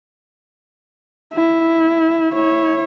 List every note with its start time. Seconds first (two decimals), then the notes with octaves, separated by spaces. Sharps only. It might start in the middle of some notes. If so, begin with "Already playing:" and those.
1.34 E4
2.33 E4 C#5